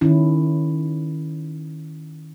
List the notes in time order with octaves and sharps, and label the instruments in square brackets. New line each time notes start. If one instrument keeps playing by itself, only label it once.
[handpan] D#3 C#4 E4